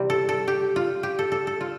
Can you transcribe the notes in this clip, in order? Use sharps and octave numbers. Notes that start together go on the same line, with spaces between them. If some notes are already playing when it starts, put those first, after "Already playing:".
Already playing: C3 E3 G3 C4
A4
A4
G4
F4
G4
A4
A4
A4
F4